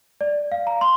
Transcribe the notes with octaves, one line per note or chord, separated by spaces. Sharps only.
D5
F5
A#5
C6